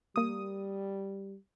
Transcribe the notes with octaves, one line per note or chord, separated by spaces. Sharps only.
G3 A#3 D#6